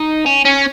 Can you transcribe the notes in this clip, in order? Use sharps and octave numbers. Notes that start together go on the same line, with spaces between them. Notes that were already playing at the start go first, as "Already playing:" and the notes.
Already playing: D#4
C#4
C#4